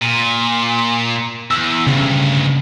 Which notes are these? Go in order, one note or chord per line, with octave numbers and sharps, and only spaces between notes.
A#2
E2 E6
D2 G2 C#3